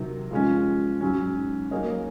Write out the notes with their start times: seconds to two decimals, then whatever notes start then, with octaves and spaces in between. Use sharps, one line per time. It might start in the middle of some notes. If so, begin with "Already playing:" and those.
Already playing: C3 D#3 F#3
0.31 F3 G#3 C#4
1.01 G#2 F#3 C#4
1.71 F#3 A#3 D#4 G#4 C#5